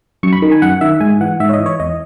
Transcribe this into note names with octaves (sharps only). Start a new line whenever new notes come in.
F#2 C#6
B5
D#3
G#5
F#2 F#5
D#3 E5
G#2 G#5
E3 F#5
G#2 E5
C#5
D#5
E3
C#5
E2 D#5